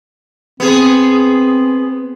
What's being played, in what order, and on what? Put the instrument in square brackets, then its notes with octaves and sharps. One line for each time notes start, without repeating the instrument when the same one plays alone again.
[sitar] B3 G#4 [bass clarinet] C4